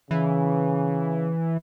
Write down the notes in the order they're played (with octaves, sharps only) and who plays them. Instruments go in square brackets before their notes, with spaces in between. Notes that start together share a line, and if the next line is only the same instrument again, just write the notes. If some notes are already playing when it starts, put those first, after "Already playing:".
[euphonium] C#3 [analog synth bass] E3